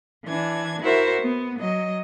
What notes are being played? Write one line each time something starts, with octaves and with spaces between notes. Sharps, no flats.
E3 D4 G#6
E4 F#4 A#4 C5 E5
B3
F#3 D#5